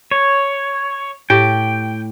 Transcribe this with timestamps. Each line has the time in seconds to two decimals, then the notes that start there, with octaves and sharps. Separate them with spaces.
0.11 C#5
1.30 A2 G4 G5